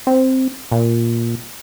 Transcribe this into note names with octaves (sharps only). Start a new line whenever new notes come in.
C4
A#2